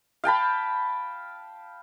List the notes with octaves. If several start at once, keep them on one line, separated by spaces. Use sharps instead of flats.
F5 G5 A5 B5